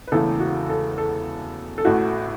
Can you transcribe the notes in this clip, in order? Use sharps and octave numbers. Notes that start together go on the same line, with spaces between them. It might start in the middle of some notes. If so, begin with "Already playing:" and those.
B4
E1 E2 C#3 E3 A3 A4
F#4
A4
A4
A4
A1 A2 A3 F#4